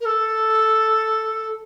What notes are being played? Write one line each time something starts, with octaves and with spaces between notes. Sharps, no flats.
A#4
A4